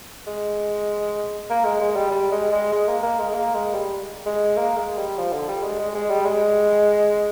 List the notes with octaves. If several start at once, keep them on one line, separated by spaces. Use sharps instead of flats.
G#3
A#3
G#3
G#3
G3
G3
G#3
G#3
G#3
A#3
A#3
G#3
A#3
G#3
G3
G#3
A#3
G#3
G3
F3
D3
G3
G#3
G#3
G#3
G3
G#3